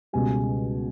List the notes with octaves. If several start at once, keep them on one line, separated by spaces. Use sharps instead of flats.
C#2 B2 G3 G#5